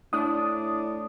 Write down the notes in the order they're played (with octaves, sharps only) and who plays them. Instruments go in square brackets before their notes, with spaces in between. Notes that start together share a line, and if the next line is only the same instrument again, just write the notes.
[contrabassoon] A2 [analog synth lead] D4 [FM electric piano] D#6